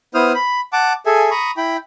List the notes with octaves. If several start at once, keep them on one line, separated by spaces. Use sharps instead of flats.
B3 E4 C5 D#6 F6
B5
F#5 A5 D6
G#4 A4 E5 G#5
A#5 B5 C#6 D#6
E4 G5 B5